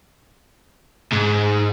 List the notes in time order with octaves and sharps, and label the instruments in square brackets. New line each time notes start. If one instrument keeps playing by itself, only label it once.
[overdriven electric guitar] G#2